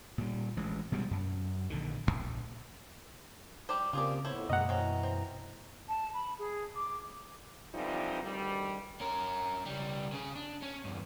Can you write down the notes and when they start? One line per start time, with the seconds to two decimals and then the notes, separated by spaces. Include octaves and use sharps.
0.18 A#2 G3
0.57 A1 E3 G#3
0.92 B2 G3 G#3
1.11 F#2
1.70 A#1 D3 D#3
2.07 D1 A#1
3.69 G3 G4 C5
3.93 C#3 A#3 C4 F4 G4 G#4 D5
4.25 F2 A2 B3 E4 C5 C#5
4.50 F#2 B2 D#3 G#3 A#3 D#5 F#5 A#5
4.69 E3 C4 C#4 A#5
5.03 C4
5.89 A5
6.14 B5
6.39 G#4
6.76 D6
7.74 D3 E3 F3 G3 C4 D#4
8.23 D2 G2 D#3 G3
9.01 C#4 A#4
9.66 C#2 G3
10.13 C#3 G#4
10.35 D4
10.62 C#4
10.84 E2 G2